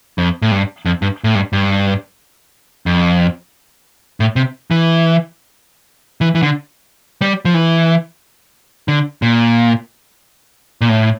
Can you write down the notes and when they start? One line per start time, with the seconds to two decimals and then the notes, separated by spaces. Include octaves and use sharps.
0.18 F2
0.42 A2
0.52 G2
0.85 F2
1.02 G2
1.24 A2
1.35 G2
1.53 G2
2.86 F2
4.20 A2
4.36 C3
4.71 E3
6.21 E3
6.35 E3
6.43 D3
7.22 G3
7.45 F3
7.54 E3
8.88 D3
9.22 A#2
10.81 A#2
10.89 A2